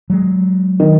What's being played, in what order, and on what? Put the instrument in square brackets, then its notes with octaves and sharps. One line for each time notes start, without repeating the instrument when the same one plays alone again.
[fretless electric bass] F#3 G#3
[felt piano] D#3